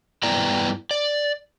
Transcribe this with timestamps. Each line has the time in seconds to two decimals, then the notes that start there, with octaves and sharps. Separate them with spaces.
0.23 G2 B3 E4 D5 G5 A#5
0.91 D5